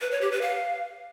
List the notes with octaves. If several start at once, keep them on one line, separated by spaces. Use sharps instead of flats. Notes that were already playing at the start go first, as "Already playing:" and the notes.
B4
C#5
G4
B4
F5